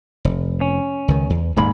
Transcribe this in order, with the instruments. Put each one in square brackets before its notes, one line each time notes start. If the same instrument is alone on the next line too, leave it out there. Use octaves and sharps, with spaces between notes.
[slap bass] F1
[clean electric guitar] C#4
[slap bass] C#2 D#3
E2
[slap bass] D#1 G#3 A#3 [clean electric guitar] G#2 B5